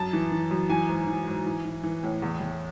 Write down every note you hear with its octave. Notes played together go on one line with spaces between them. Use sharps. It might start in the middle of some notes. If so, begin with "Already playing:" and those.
Already playing: F#2 A5
E3
E3
F#2
E3 G#5
G#2
E3
G#2
E3
E3
E3
A2
E2
E2